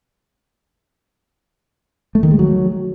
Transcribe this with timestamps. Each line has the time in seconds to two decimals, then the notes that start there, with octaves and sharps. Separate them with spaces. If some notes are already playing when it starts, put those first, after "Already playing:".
2.15 A3
2.23 D#3
2.31 G#3
2.39 F#3